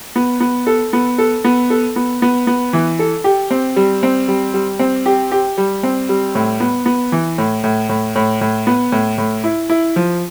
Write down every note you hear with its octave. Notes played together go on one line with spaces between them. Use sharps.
B3
B3
A4
B3
A4
B3
A4
B3
B3
B3
E3
A4
G4
C4
G3
C4
G3
G3
C4
G4
G4
G3
C4
G3
A2
B3
B3
E3
A2
A2
A2
A2
A2
B3
A2
A2
E4
E4
F3